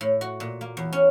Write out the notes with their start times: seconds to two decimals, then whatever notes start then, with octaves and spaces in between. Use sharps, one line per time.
0.01 A2
0.21 F#4
0.40 A#2
0.61 A#3
0.77 E2
0.93 C#4